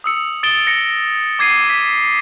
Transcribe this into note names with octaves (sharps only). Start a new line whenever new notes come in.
D#6 E6 C#7
D#6 A6 D7 E7 G7
A#6 C#7
D6 G#6 C7 D#7
B6